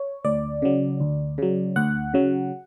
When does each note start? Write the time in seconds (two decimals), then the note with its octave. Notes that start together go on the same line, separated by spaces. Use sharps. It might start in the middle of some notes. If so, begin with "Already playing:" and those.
Already playing: C#5
0.25 D2 D5
0.62 C#3 F#3
1.00 D2
1.38 C#3 F#3
1.76 D2 F#5
2.14 C#3 F#3